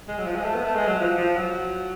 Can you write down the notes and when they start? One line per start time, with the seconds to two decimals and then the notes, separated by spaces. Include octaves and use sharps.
0.08 G#3
0.18 F#3
0.27 F3
0.36 G#3
0.45 A3
0.54 B3
0.63 A3
0.76 G#3
0.88 F#3
1.00 F3
1.17 F3
1.36 F#3